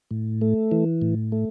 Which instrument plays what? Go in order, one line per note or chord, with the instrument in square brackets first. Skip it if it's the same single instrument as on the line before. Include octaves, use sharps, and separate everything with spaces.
[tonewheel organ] A2
A3
E3
A2
A3